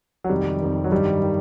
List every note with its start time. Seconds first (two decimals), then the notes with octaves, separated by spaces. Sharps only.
0.24 F#3
0.29 F2 C3 D#3 G3
0.61 F2 C3 D#3
0.84 F#3
0.92 G2 D#3 G3
1.23 D#3